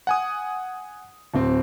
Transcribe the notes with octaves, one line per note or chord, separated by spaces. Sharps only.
F#5 G#5 D#6
D1 C4